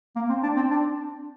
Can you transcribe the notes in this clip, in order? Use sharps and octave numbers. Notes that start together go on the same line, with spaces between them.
A#3
C4
D4
C4
D4